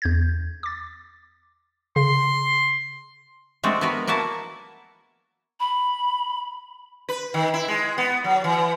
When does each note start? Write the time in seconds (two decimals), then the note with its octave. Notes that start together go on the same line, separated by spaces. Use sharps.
0.02 E2 G6 G#6
0.63 D6 A6
1.96 C#3 C6
3.63 F3 G#3 A3 C4 D4 F#4
3.81 B3 F#4 A#4 B4
4.07 A#3 E4 F#4 G#5 A5
5.60 B5
7.09 B4
7.34 D#3
7.54 E4
7.68 G#3
7.98 B3
8.24 F#3
8.44 E3